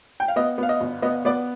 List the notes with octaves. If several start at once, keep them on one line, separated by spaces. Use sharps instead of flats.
G5
F5
B3 D#5
B3 F5
D#5
G1
B3 D#5
B3 D5